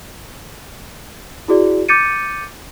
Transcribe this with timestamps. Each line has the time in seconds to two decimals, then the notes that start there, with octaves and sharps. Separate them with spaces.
1.48 E4 F#4 G#4 D5
1.89 D6 G6 A6 C#7 D#7